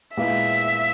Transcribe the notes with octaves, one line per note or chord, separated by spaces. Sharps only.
A#2 G#3 B3 E4 E5